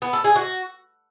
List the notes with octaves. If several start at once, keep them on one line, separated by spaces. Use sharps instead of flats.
B3
A4
G#4
F#4